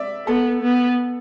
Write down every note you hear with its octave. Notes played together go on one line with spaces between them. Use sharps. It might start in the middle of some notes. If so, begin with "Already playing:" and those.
Already playing: D5 E5
B3 A4
B3